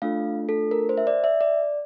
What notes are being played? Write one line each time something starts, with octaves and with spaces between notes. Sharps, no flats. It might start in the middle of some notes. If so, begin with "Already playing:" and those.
A3 D4 F4 A4 F5
A4
A#4
C5
E5
D5
E5
D5